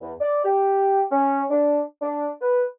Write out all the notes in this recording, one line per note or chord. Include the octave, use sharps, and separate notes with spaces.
E2
D5
G4
C#4
D4
D4
B4